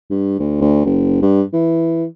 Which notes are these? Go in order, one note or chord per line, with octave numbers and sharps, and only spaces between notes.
G2
D2
D2
F#1
G2
E3